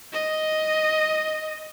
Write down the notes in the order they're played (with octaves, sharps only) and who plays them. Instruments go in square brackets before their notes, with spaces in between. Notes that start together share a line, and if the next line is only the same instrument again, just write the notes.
[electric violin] D#5